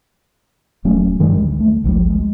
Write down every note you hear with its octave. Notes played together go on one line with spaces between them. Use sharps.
D#1 F#3 A3 C#4
G2 D#3 G3 G#3
D2
A3
G#1 D2 F3 G3
G#3